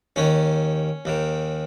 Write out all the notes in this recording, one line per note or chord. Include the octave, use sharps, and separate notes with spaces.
D#2 D#3 C#4
D#2 D#3